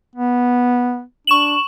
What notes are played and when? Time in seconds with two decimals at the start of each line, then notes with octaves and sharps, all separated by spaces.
0.16 B3
1.27 D4 C#6 E7 F#7